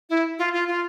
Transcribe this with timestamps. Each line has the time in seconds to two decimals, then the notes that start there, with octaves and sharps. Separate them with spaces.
0.10 E4
0.39 F4
0.53 F4
0.68 F4